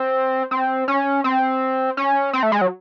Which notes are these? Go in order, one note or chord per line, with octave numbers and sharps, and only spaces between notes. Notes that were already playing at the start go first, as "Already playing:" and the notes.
Already playing: C4
C4
C#4
C4
C#4
C4
A3
G#3
F#3